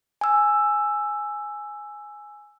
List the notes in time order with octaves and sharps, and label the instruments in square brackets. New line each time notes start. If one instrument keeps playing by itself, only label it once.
[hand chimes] G#5 E6